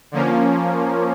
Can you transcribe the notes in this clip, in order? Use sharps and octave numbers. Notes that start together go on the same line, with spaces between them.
D3 F3 A#3 C#4